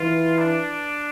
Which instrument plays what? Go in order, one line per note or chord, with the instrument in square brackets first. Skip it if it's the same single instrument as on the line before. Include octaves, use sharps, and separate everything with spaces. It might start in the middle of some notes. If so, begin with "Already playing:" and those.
Already playing: [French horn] E3 [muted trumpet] F4
[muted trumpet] D4